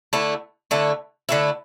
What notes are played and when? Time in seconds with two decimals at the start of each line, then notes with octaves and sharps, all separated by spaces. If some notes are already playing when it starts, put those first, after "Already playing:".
0.13 D3 A3 E4
0.71 D3 A3 E4
1.29 D3 A3 E4